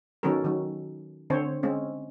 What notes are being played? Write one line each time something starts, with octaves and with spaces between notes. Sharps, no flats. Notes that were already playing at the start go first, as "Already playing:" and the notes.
D#3 F#3 B3 C#4 A4 A#4
D#3 F#3
D3 C4 C5 C#5
G#3 C4 C#4